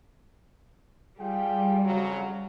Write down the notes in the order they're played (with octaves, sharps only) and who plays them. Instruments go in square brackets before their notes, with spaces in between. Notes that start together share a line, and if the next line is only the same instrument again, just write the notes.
[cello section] G3 [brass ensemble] F4 G#4 G5
[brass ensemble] F2 C#3 F#3